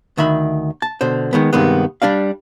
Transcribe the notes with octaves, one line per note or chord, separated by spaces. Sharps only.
D2 D#3 E5 B5
A5
B2 D3 C5
D#3 G#3 B3
G2 C3 D#3 G#3 B3
G3 D4 D5 F5